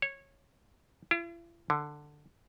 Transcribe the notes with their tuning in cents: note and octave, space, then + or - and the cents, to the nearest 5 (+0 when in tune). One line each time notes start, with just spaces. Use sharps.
C#5 -15
E4 +45
D3 +10